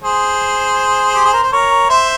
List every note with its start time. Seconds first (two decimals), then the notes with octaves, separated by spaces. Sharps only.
0.03 G#4 C5
1.15 G4
1.25 G#4
1.33 A#4
1.43 C5
1.52 A#4 C#5
1.89 C5 E5